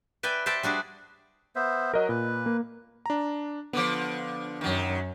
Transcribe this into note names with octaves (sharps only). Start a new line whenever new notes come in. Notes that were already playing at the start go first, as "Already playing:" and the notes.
B4 D5 E5 G5 G#5
C5 D5 E5 G5 A5
G3 D4 F#4 G#4
B3 C5 E5
F#3 A#4 D#5
A#2 B4
A#3
D4 A#5
D3 F3 B3 D6
F#2 D#3 F#3 C#4